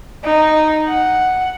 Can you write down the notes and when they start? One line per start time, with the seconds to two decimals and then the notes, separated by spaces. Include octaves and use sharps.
0.24 D#4
0.88 F#5